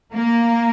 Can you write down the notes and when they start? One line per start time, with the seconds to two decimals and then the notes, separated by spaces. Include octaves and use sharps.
0.13 A#3